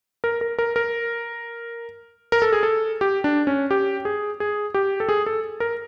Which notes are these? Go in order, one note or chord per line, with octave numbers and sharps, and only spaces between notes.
A#4
A#4
A#4
A#4
A#4
A4
G#4
A4
G4
D4
C#4
G4
G#4
G#4
G4
A4
G#4
A4
A#4